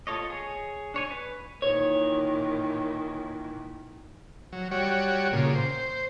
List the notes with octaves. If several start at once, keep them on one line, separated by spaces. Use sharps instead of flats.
F4 A4 C#5 D#5
G#4 C#5
D4 C#5 G#5
B4
A#2 D#3 E3 C#5
F#3
G3 F#4 C#5
A#2 C#3
C5